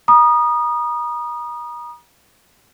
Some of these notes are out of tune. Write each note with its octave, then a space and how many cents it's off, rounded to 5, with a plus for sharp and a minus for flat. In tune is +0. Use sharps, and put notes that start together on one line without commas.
A#5 +40 D#6 -20